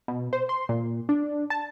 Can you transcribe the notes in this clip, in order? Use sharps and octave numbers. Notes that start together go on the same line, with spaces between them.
B2
C5
C6
A#2
D4
A5